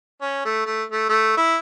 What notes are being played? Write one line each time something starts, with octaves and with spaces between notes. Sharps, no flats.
C#4
A3
A3
A3
A3
E4